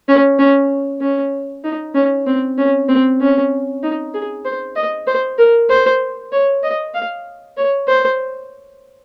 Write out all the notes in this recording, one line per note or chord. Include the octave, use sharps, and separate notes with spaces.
C#4
C#4
C#4
D#4
C#4
C4
C#4
C4
C#4
D#4
G#4
C5
D#5
C5
A#4
C5
C#5
D#5
F5
C#5
C5